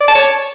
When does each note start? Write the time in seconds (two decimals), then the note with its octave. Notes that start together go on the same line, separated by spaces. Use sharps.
0.01 D5
0.08 A5
0.15 C#5